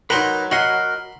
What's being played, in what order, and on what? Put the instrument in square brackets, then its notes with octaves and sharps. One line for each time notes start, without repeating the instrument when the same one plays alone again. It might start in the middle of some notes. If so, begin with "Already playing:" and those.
[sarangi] F#3 [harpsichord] D#4 A#4 [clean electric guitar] B4 B5 C6
[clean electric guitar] F#4 D#5 F#5 [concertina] A#4 [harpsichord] B5 C6